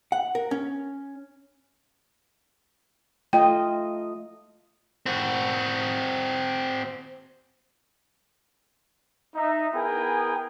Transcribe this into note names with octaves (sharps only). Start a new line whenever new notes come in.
F#5
A#4
C#4
A3 F4 D#5 G5
C4 F#4
D#4 E5
B3 E4 G#4 A#4 G5 G#5